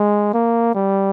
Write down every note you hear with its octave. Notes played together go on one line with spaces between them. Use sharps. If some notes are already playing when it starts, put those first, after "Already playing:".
Already playing: G#3
A#3
G3